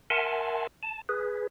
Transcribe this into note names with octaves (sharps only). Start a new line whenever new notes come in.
A#4 E5 F#5 G#5 A5 C6
A5
G#4 B4